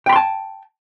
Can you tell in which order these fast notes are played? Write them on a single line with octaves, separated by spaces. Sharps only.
G5 B5 C6 A5